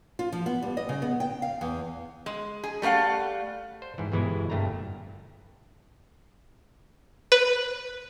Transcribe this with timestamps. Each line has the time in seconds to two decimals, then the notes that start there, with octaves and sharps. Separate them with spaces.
0.19 F4
0.33 F3
0.46 B3
0.62 G3
0.77 D#5
0.89 C#3
1.02 B3
1.20 G5
1.42 F5
1.61 E2
2.26 G#3
2.64 G#4
2.82 G3 A3 A#4 F5 F#5
3.82 C5
3.98 G#2 E3
4.12 G1 B2 E3 G#3 E4
4.50 G1 G2 A3 A#3 D4 A#5
7.32 B4